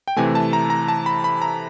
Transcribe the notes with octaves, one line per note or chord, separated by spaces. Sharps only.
G5
C3 E3 A3 G#5
A5
A#5
A#5
A5
B5
B5
A#5